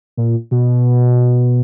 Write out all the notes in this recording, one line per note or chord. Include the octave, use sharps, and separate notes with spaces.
A#2
B2